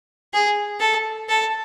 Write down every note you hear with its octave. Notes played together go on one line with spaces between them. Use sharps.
G#4
A4
A4